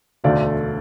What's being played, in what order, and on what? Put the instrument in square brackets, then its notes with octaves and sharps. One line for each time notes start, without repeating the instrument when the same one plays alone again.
[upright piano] E1 D2 D3 A3 D5 F5